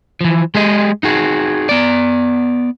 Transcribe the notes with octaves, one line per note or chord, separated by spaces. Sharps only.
E3 F3
G#3 G4 G#4 D#5
D#4 F#4 G#4
B3 D5